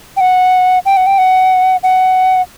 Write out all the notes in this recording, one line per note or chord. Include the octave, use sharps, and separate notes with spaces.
G5
F#5
G5
F#5
G5
F#5
F#5